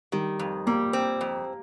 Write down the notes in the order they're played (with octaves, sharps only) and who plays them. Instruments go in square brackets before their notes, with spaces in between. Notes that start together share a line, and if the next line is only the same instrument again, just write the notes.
[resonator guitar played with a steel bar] D#3 [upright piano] G3
[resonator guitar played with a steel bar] F2
[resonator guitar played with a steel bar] G3 [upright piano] A#3
[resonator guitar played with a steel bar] C4
F2